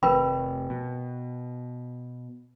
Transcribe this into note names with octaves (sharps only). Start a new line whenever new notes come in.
F1 F2 A#4 B4 G5 B5
B2